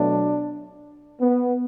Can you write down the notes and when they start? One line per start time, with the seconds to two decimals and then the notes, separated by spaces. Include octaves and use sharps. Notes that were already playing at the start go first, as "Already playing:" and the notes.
Already playing: B2 F#3 A3 D4
1.20 B3